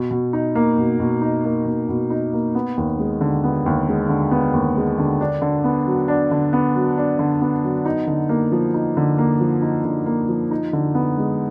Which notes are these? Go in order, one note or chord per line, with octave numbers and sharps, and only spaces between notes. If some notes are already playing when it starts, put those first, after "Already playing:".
Already playing: B2
B2
D#4
A#3
B2
B2
D#4
A#3
B2
B2
D#4
A#3
B3
D#2
G#3
D3
B3
D#2
G#3
D3
B3
D#2
G#3
D3
D4
D3
B3
F#3
D4
D3
B3
F#3
D4
D3
B3
F#3
D#4
D3
A#3
F3
D#4
D3
A#3
F3
D#4
D3
A#3
F3
D#4
D3
B3
G#3